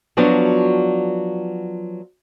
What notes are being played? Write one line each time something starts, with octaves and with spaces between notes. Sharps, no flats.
F3 F#3 B3 D4 F4 F#4